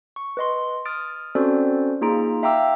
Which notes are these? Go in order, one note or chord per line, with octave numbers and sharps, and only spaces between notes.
C#6
B4 D#5 C6
D#6 F6 A6 D7
C4 C#4 F#4 A4 C5 D5
A#3 D#4 F4 G#4 A#5 D7
E5 F5 G5 A#5 D6 E6